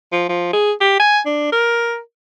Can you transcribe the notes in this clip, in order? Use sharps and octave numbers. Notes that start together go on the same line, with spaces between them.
F3
F3
G#4
G4
G#5
D4
A#4